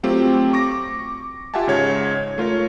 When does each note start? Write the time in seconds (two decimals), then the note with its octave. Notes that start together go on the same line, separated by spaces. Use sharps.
0.03 F#3 A3 C4 F4 G4
0.53 C#6 D6 A#6
1.54 F4 G4 E5 F#5 G#5 A5
1.67 G#2 C#3 C#5 G#6
2.38 A3 F4 A#4 C#5